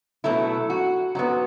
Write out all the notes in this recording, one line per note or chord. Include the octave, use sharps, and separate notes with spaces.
B2 F#3 A3 E4
F#4
G#2 F#3 B3 F#4